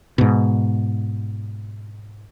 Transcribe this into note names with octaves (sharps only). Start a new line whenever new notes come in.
G#2 B2